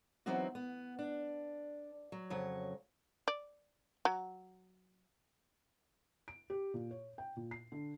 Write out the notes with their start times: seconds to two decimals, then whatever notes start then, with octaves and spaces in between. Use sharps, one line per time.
0.26 E3 F#3 B3 C4 D#4 F#4
0.55 B3
0.99 D4
2.12 F#3
2.30 F2 C#3 F#3 C#5
3.28 D5
4.05 F#3
6.28 D7
6.50 G4
6.74 A#2
6.91 C#5
7.18 G5
7.36 A#2
7.51 C7
7.72 D3